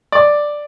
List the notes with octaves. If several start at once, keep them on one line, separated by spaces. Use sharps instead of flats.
D5